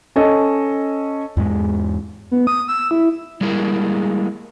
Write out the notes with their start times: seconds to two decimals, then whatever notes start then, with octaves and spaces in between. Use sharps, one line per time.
0.16 C#4 A4 D#5
1.37 E2 G#2 G#3
2.31 B3
2.47 D#6
2.68 E6
2.91 E4
3.41 G3 G#3 A#3 E4 G#4 A#4